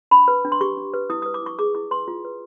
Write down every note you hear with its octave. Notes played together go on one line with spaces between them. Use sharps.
D4 B5
B4
D4
C6
G4 C#6
D4
B4
E4 D#6
B4 D#6
D6
E4 C#6
G#4 D6
E4 D6
B4 C6
F4
B4